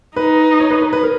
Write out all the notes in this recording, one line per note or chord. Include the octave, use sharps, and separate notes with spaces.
D#4 B4
C#5
B4
B4
B4
A#4